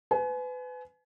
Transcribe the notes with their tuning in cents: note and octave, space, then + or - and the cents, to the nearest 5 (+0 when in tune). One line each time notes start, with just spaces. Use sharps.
B4 +30 G#5 +35